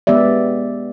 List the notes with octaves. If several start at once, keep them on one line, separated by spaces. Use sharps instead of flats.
G#3 B3 G4 D5 E5